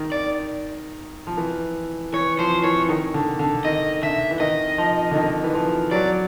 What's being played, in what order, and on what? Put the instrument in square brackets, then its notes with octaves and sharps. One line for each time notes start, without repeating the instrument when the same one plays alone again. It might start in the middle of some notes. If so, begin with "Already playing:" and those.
Already playing: [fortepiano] D#3
[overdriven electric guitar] D5
[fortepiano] F3
E3
[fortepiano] E3 [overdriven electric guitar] C#5
[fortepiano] F3 [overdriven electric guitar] C5
[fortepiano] E3 [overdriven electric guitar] C#5
[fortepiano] D#3
D3
D3
[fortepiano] D#3 [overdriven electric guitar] D#5
[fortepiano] D3 [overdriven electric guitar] E5
[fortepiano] E3
[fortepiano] D#3 [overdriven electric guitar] D#5
[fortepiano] F3
D3
D#3
E3
F3
[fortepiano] F#3 [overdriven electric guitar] D5